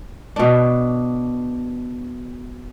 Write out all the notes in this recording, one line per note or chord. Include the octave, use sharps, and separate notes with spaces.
B2 D4